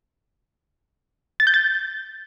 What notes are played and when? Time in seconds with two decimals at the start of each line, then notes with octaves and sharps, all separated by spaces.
1.40 A6
1.47 G6
1.54 A6